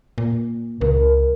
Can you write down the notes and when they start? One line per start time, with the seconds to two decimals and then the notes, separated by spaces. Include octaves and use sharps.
0.18 A#2
0.81 C#2 A#4